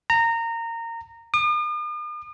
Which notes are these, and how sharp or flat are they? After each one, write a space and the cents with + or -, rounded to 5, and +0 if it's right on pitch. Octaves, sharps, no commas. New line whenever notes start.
A#5 -20
D#6 -45